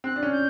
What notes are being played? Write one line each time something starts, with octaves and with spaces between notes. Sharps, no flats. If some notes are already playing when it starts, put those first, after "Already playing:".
C4 F#6
D4
C#4
G6